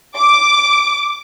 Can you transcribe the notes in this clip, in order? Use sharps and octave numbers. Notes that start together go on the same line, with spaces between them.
D6